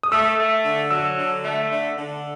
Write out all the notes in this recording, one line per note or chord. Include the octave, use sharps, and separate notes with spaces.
D#6
A3 E6
A3
D3
F#3 E6
D3
A3
D3
D3